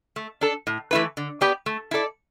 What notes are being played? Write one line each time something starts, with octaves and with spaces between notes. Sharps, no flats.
A3
D4 A4
A2
E3 A3 E4 B4
D3
B3 G4 B4 D5
A3
E4 A4 D5